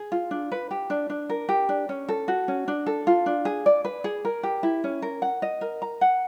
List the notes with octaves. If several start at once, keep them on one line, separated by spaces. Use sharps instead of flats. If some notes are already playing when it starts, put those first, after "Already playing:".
Already playing: G#4
F4
D4
B4
G4
D4
D4
A#4
G4
D4
C#4
A4
F#4
C#4
D4
A4
F4
D4
G#4
D5
B4
G#4
A#4
G4
E4
C#4
A#4
F#5
D#5
A#4
A#5
F#5